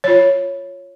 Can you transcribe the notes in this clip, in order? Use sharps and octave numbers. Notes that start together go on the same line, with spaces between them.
F4 C#5